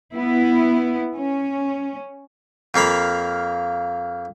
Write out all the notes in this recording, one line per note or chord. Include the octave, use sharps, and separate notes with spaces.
B3 E4
C#4
F2 A#3 F5 B5